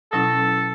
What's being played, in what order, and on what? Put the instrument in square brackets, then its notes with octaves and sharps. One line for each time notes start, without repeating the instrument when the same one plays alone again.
[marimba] B2 F#3 C#4 E4 [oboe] A4